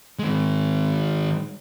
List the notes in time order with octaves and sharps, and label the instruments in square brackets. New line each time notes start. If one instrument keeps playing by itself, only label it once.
[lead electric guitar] D#3 G#3